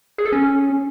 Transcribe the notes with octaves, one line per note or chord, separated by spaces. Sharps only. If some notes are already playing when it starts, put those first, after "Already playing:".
G#4
A4
C#4